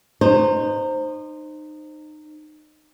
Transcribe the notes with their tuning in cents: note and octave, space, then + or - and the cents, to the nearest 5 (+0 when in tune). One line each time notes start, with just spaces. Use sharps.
D#4 -25 C5 +5